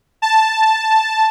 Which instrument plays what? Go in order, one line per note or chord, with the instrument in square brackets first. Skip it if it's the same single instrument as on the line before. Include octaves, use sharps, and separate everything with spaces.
[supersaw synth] A5